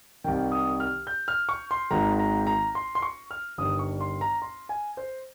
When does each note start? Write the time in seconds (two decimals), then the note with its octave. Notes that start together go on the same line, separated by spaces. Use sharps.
0.24 C2 C3 D#3 G5
0.52 D#6
0.80 F6
1.07 G6
1.28 F6
1.49 C#6
1.71 C6
1.91 G#1 G#2 D#3 A#5
2.19 A#5
2.47 A#5
2.75 C6
2.95 C6
3.02 C#6
3.31 F6
3.58 G1 G2 D#3 D#6
3.79 C#6
4.01 C6
4.21 A#5
4.42 C6
4.69 G#5
4.97 C5